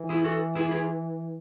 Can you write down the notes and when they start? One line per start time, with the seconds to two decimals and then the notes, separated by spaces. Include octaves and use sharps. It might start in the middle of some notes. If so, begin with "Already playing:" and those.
Already playing: E3
0.09 E4 G#4
0.24 F#4 A4
0.55 E4 G#4
0.71 E4 G#4